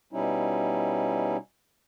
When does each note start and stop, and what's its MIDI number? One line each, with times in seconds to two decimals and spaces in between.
0.13 1.37 47
0.13 1.37 55
0.13 1.37 61
0.13 1.37 63
0.13 1.37 64